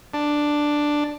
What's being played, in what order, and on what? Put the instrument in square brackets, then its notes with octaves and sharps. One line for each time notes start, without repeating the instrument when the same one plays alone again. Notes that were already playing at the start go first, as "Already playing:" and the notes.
[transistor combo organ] D4